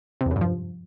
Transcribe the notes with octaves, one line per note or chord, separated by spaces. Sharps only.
C3
E2
F#2
G2
F3